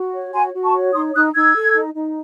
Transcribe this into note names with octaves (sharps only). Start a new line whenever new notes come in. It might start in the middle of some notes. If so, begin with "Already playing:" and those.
Already playing: F#4
C#5
F#4 G#5 C6
F#4
A5 C#6
C#5
D#4 C6 D#6
D#4 D#6 F#6
D#4 E6 G#6
A4
D#4
D#4